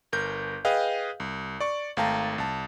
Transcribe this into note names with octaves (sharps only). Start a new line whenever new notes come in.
G1 A#4 G6
G#4 B4 D#5 F5 G5
C2
D5 C#6
G#1 A3 F5 G5 A5 A#5
C2 A5